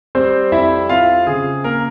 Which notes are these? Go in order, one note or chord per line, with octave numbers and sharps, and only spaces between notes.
G3 C4 C5
F2 E4 E5
C4 F4 F5
C#3 G#4
A#3 A#4